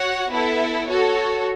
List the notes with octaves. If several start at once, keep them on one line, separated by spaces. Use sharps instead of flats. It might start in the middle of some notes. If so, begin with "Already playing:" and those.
Already playing: F#4 C#5 F#5
B3 E4 A4 E5
F#4 A4 C#5